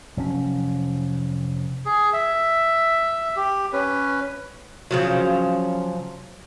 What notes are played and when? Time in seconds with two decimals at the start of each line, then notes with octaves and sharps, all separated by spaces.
0.17 F1 F#3 C#4
1.85 G#4
2.13 E5
3.36 G4
3.73 C#4 B4
4.91 C#3 F3 F#3